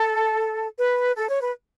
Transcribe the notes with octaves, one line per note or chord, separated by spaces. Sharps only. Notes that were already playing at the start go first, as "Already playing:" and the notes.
Already playing: A4
B4
A4
C#5
B4